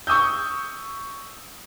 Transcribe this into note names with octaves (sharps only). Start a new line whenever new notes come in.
C#6 D#6 E6 G6